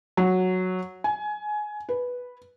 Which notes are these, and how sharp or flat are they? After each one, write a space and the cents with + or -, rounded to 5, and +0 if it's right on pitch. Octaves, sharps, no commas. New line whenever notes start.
F#3 -5
G#5 +20
B4 -5